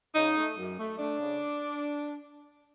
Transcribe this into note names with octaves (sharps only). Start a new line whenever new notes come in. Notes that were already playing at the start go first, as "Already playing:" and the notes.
C#3 D#4
A3
F#2
A3
A3 D4
C#3